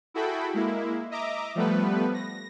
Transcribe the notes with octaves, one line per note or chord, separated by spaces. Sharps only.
E4 F#4 G#4 A4 G5 B5
G#3 A#3 E4
D#5 E5 A#5 D6
F3 G3 A3 B3 B4
A#6